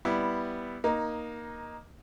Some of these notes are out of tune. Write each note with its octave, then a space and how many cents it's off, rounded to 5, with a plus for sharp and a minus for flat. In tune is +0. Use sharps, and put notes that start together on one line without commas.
G3 +0 B3 +0 E4 +0
A#3 +15 D#4 +0